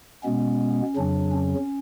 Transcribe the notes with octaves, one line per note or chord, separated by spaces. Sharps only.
B2 G#3 B3 C#4
F2 C#3 F#3 D4
C#4